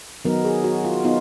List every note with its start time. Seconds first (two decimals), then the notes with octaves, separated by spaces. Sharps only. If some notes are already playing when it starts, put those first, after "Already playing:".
0.25 D#3 F#3 B3 D#4 A#4
0.45 G#4
0.64 F#4
0.85 F4
1.04 B3 D#4 F4